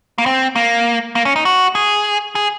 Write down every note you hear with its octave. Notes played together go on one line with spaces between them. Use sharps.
A#3
C4
A#3
A#3
C#4
D#4
F#4
G#4
G#4